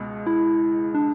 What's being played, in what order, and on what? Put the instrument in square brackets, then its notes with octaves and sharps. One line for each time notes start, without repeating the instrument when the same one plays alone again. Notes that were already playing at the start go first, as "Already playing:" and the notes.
Already playing: [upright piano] C#2 B2 G#3
[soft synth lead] E4
D4